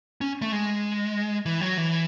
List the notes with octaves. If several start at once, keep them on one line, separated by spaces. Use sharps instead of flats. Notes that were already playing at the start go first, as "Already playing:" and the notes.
C#4
A3
G#3
E3
F#3
E3